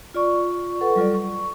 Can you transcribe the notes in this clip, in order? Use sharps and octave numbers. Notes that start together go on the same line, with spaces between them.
F4 D5 C#6
A4 B4 F#5 C#6
F#3 G3 F4 A4 D5
C#6